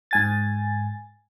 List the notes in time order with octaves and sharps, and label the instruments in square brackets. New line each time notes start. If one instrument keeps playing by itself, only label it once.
[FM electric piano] G#2 G#5 A6